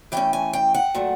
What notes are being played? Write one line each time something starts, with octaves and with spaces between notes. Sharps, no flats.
E3 A3 C#4 G5
G#5
G5
F#5
A#2 F#3 A3